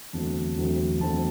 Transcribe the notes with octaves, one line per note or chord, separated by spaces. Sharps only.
E2 D3 F#3 A3 C4 A5
E2 D3 F#3 A3 C4
E2 D3 F#3 A3 C4 A5